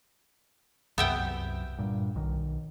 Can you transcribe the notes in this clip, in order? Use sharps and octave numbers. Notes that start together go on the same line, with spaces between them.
C2 F#2 B3 E5 G5
G2 A#2
B1 D#3